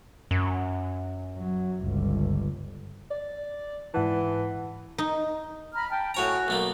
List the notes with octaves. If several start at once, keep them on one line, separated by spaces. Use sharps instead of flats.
F#2
F#3
G1 C#2
D5
G#2 E3 F#5 A5
D#4
A#5 B5 F6
G5 A5
A2 F#4 C#5 G#5 A#5
B1 A3 A#3